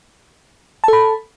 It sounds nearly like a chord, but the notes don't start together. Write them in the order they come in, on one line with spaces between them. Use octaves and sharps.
A5 A4 B5